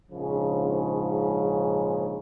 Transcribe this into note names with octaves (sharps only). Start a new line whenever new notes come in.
A#1 G#2 C#3 F3